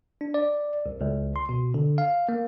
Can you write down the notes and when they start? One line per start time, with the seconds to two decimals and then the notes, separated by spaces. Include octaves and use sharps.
0.21 D4
0.34 D5
0.86 C2
1.01 C#2
1.36 C6
1.49 B2
1.74 D3
1.98 F5
2.29 A#3